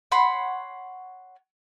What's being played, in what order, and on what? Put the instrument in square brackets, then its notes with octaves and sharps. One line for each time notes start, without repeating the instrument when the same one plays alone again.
[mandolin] C#5 F#5 B5 C6